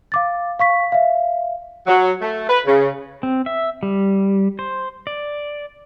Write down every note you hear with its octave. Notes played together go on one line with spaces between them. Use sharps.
F5 D6 A6
F5 C#6 B6
E5 F5
F#3
A3
B4
C#3
C4
E5
G3
C5
D5